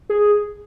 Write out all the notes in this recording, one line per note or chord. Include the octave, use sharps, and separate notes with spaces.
G#4